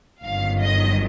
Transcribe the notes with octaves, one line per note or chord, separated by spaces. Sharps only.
G1 F#2 D#3 F5
D#5